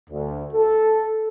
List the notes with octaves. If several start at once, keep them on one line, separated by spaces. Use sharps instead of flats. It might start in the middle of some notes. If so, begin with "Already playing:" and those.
D2
A4